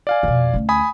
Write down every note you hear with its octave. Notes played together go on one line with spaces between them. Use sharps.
D5 F5 G#5
F2 B2
D2 C#4
G#5 B5 D#6